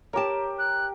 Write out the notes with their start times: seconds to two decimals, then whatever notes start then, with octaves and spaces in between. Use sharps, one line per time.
0.13 G4 A#4 C#5 A5
0.59 F#6